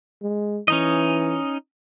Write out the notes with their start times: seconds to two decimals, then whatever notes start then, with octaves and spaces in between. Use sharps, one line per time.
0.22 G#3
0.68 E3 C#4 D#4 D#5